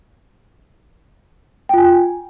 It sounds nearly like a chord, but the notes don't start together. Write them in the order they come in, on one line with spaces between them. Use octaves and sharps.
G5 F4 G#5